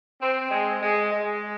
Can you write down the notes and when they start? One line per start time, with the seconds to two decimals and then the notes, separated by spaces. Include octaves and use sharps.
0.21 C4
0.51 G#3
0.82 G#3
1.13 G#3